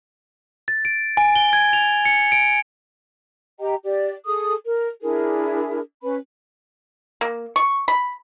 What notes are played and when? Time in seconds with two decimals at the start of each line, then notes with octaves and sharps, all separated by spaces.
0.68 A6
0.85 D7
1.17 G#5
1.36 G7
1.53 G#6
1.73 F7
2.05 C#7
2.32 D7
3.60 G4 D#5 G5 A#5
3.84 G4 D5
4.26 G#4 A4 D#6
4.65 A#4
5.01 D4 E4 G#4 A#4
6.03 C#4 B4 B5
7.21 A#3
7.56 C#6
7.88 B5